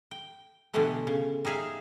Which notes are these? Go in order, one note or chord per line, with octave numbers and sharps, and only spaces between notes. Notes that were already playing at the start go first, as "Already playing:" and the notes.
G5
B2 D3 E3 G3 A3 B3
C#3
G3 D#4 G#4 E5 F5